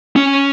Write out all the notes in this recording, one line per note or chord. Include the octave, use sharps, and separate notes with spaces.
C#4